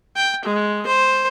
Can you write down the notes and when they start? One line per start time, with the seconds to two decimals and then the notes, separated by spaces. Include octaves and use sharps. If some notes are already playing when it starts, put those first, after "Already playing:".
0.16 G5
0.45 G#3
0.87 C5